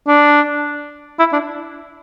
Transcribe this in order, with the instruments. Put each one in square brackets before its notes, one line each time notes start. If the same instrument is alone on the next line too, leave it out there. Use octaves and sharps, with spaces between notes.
[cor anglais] D4
E4
D4